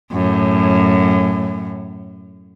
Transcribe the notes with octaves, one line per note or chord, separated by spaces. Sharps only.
F#2 A2